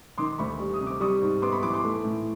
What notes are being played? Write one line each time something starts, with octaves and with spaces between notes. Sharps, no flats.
D#3 C6 D6
D2 B5 C#6
G3
D#6
C3
D6
G3 C#6 D#6
G#2
B3 C6 D6
B5 C#6
E3 C6 D6
C6 D6
A3
A2